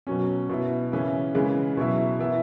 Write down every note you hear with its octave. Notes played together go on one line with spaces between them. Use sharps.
B2 F#3 C#4
B2 B3 E4
C#3 E3 C#4 E4
C#3 E3 G#3
B2 F#3 E4
E3 B3 E4